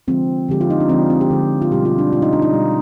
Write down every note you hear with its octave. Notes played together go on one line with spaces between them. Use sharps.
D3 F3 G#3 C4
D3 F3 G#3 G4
F4
D#4
D4
D3 F3 G#3 C4
C4
G4
D3 F3 G#3
F4
B2 G3 G4
F4
D4
B2 G3 F4
D#4
D4
D#4
B2 G3